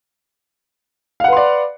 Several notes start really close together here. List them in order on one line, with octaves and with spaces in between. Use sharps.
F5 F#5 B4 C6 D5